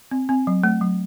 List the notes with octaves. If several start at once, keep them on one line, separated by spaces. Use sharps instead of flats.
C4
C4
F#3
A3
F#3